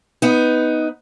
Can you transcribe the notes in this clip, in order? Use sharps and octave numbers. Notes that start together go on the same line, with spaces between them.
B3 D#4